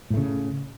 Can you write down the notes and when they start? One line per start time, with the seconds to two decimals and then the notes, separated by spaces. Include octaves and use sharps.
0.10 A2
0.14 A3
0.17 C#3